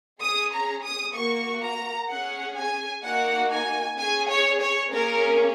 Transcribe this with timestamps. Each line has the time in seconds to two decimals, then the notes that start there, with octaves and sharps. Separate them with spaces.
0.21 C#4 G#4 D#6
0.53 A#5
0.83 D#6
1.15 A#3 F#4 C#6
1.63 A#5
2.09 C#4 G#4 F#5
2.56 G#5
3.03 A#3 D#4 F#4 F#5
3.50 G#5
3.97 C#4 G#4 G#5
4.29 C#5
4.60 C#5
4.92 A#3 C#4 G#4 A#4